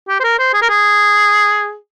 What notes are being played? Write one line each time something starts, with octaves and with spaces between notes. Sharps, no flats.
G4
C5
A#4
C5
G#4
A#4
G#4